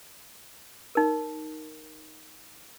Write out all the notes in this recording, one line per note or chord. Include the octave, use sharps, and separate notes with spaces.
D#4 A#4